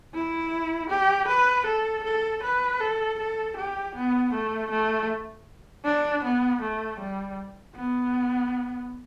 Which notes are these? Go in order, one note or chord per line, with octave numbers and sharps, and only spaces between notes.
E4
G4
B4
A4
A4
B4
A4
A4
G4
B3
A3
A3
D4
B3
A3
G3
B3